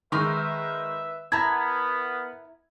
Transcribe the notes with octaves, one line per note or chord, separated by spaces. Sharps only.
D#3 G#3 D#4 B4 E5 C6 C#6
B3 E4 A#4 A5 A#5 G#6